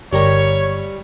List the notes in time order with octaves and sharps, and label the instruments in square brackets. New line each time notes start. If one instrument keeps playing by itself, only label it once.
[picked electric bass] G1 [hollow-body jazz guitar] G3 G4 A#4 [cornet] C#5